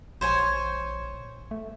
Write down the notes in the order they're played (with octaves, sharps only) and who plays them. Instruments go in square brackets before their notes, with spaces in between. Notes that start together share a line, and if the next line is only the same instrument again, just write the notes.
[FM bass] A#1 [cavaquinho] C5 C#5 G#5
[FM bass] A3